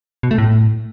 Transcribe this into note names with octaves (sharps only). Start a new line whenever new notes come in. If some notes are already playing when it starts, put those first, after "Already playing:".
B2
A3
A2